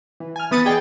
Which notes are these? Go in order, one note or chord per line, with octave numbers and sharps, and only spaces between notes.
E3
G#5 F6
E3 B3 B5 D#6 A6 C#7
G#4 D5 D#5 G5 G#5